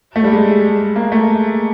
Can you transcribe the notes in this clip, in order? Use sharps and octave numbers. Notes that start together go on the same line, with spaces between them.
A3
G3
G#3
A#3
A3